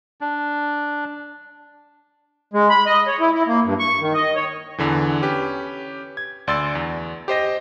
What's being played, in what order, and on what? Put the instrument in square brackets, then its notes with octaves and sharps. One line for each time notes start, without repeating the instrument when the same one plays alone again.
[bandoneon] D4
[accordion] G#3
B5
D#5
C#5
E4
E4
A#3
G2
C#6
D#3
D#5
C#5
[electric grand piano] E2 D3 E3
C#4 G4 B4
G#6
D2 D5 C6 E6 A6
E2
G4 C5 D#5 A#6